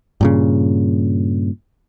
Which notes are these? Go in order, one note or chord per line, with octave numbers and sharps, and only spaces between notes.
G2 A#2 C#3